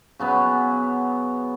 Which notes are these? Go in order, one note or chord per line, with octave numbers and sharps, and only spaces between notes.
C#3 F#3 B3